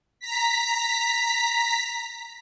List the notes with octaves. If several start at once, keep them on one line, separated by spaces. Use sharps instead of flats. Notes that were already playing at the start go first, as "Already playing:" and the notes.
A#5 B6